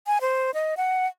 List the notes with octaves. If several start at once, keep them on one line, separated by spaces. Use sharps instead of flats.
G#5
C5
D#5
F#5